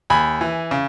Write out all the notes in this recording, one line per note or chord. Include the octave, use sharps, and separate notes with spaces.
D#2 G#5 B5
E3
C#3